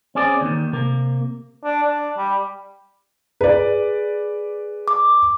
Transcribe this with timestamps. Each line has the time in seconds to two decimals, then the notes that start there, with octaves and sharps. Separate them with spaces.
0.15 C4 C#4 G#4 D5
0.41 D#2 D#3
0.72 C3 A#3
1.64 D4
1.84 D4
2.18 G3
3.41 G#4 B4 D5
4.88 D6